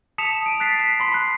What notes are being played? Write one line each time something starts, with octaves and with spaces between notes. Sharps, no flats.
A5 D#6 B6 C#7 E7 F7
D7 D#7
F#6 A6 B6 C7
B6
B5 C6 B6
F#6 C7